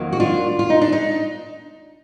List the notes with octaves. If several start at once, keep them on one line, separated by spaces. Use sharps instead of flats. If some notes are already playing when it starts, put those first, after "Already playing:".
Already playing: F2 D#3 F#3 A#3
F#4
D4 F4
F4
D#4
D4
D#4